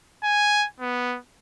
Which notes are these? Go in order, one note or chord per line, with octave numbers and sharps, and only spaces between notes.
G#5
B3